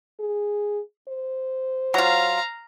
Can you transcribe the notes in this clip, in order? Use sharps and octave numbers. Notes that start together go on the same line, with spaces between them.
G#4
C5
F#3 F4 F5 A#5